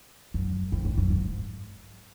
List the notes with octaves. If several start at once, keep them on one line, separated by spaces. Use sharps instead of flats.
F#2
F2
G2
F#2
G#2